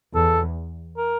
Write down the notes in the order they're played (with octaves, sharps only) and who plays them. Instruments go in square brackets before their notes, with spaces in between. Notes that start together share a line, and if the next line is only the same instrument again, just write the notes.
[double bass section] E2 [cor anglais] A4
[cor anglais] A#4